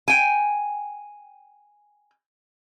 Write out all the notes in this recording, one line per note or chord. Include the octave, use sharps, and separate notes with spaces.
G5 G#5